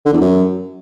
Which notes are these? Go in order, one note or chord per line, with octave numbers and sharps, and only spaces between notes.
D3
E2
F#2